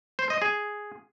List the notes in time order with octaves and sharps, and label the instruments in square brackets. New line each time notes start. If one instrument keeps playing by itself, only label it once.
[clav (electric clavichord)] C5
D#5
G#4